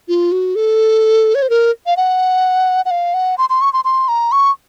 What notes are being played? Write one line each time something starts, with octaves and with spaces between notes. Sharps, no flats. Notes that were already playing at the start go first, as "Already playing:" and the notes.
F4
F#4
A4
C#5
C5
A#4
F5
F#5
F#5
F5
F#5
C6
C6
C#6
C6
C6
A#5
C#6